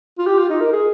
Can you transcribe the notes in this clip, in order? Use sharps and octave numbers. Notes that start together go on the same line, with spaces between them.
F4
G4
F4
D#4
A#4
G#4